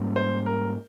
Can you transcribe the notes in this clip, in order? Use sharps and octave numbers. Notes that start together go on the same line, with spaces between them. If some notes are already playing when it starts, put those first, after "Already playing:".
Already playing: G#2 G3 A#3 C#4
C5
A#4